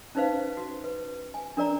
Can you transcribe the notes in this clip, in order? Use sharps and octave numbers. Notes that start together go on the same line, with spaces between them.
C#4 D#4 B4 C5 F5
F#4
B4
G#5
D4 A#4 D5 A#5